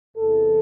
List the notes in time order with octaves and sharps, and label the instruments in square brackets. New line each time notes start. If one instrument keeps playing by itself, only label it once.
[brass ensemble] E2 C3 E3 A4